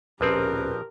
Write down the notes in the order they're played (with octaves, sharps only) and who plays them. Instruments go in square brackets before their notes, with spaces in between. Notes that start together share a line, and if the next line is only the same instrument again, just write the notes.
[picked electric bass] D1 C#4 [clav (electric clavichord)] A#1 F3 C4 [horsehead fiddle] G4 A#4 [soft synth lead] B4